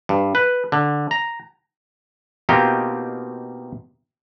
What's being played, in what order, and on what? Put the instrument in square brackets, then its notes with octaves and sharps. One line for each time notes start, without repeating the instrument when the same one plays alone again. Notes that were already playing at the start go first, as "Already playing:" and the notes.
[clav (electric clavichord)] G2
B4
D3
A#5
B2 A#3 C4 D#4 F4 G4